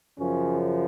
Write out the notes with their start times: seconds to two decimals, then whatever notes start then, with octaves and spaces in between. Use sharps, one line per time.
0.18 F#2 C#3 F3 C#4